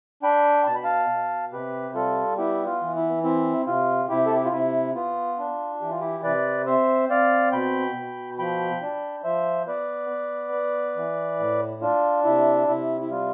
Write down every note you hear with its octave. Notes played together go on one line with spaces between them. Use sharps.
D4 G5 B5
B2 A5
B5
F5 A5
B2
C3 G4 B4
G3 F4 A4
B3 E4 G4
F4
E3
E4
C4 E4
C3 F4
C3 E4 G4
A4
G4
F4
C3 E4
B3 F4
D4
E3 G4
F4
E4 G4
C3 B4 D5
C4 C5 E5
C4 D5 F5
B2 G5 B5
B2
F3 G5 B5
D4
F3 C5 E5
B3 B4 D5
B3
B3
E3
A2
D4 F4
C3 E4
C3 E4
E4
G3 F4